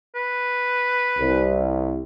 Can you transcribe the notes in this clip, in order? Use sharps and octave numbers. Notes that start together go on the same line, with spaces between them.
B4
C2